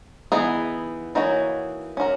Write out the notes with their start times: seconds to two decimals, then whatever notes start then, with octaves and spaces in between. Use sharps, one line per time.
0.32 E3 B3 D#4 G#4
1.15 E3 A#3 D#4 F#4 C#5
1.97 C#4 F#4 A#4